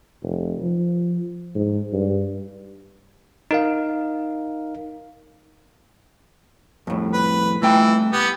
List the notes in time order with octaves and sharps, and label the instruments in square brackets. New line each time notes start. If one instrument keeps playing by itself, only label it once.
[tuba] F1
F3
G#2
G2
[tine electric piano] D#4 A#4 F5
[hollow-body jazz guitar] F2 A2
[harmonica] B4
[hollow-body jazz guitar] C2 A3 G5 [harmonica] E3
[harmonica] B3 G4